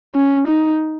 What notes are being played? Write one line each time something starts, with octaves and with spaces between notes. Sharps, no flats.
C#4
D#4